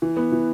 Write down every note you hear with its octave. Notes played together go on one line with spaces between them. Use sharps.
E3
B3
E3